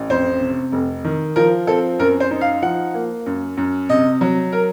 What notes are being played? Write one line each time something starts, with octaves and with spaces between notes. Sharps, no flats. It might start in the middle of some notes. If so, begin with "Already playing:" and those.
Already playing: A1
F2 C5
C3
F1
D#3
F3 A#4
C4 A4
F#2 A#4
C5
D#4
F5
F3 F#5
A#3
F#2
F#2
C3 D#5
F#3
A#4